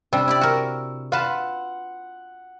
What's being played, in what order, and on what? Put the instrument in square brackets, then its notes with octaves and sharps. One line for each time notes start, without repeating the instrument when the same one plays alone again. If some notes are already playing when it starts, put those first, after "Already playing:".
[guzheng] C3 G3 D4 [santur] E6
[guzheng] E4 G4 D5
F#4 A#4
[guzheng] F4 B4 A5 [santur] F#5